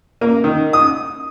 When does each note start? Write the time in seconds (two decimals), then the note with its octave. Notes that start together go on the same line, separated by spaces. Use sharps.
0.21 A#3
0.44 D#3
0.73 D#6